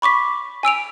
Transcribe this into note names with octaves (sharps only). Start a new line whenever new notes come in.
B5 C#6 D6 B6
G#5 E6 D7 F7